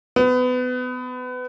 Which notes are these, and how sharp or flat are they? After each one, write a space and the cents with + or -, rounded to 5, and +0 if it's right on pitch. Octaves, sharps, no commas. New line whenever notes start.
B3 +25